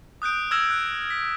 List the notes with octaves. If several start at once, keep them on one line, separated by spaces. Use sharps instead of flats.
D#6 F#6 G6 D7
E6 F6 G#6 A#6 E7
F#6
B6